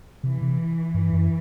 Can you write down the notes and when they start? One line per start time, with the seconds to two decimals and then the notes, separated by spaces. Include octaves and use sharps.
0.24 C3 E3
0.42 C3
0.94 G2
1.13 F#2